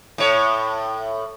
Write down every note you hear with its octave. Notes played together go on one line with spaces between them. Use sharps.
A2 C#5